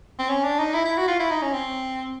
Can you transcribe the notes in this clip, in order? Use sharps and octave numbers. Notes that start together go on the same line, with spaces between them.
C4
C#4
D4
D#4
E4
E4
F#4
F4
E4
D#4
C#4
C4